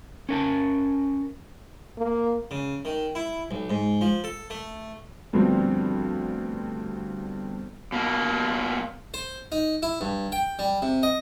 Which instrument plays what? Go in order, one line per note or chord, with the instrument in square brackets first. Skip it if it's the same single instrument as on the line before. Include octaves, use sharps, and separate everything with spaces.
[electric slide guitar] C#4 A#4 A5
[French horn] A#3
[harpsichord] C#3
D#3
E4
B1
G#2
F3
A4
A3
[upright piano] D2 G2 F3 B3 C4 D4
[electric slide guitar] B2 A#3
[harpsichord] C5
D#4
E4
G2
G5
G3
C3
D#5